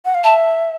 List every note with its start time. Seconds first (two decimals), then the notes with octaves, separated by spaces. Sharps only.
0.05 F#5
0.15 F5
0.24 E5 A5